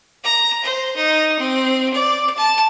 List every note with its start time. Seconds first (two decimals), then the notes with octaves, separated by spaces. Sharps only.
0.24 A#5
0.64 C5
0.96 D#4
1.39 C4
1.93 D5
2.37 A5